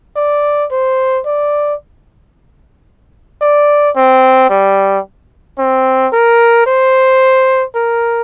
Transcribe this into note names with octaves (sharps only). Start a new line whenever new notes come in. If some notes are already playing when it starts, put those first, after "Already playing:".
D5
C5
D5
D5
C4
G3
C4
A#4
C5
A#4